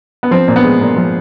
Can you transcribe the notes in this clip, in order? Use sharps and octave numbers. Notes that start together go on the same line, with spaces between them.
B3
F3 C4
A#2
B3
G#3
A#2
F3